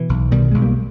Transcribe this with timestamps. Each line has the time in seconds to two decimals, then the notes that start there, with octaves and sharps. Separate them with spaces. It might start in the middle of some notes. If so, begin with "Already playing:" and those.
Already playing: B2 E3
0.09 B1
0.31 B2 D#3 G3
0.51 B1 G#3
0.62 G3 A#3